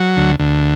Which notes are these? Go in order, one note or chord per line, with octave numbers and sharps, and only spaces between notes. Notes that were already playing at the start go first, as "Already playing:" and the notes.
Already playing: F#3
D2
D2